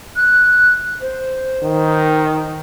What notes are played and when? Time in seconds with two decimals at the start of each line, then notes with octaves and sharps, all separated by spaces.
0.16 F#6
1.01 C5
1.63 D#3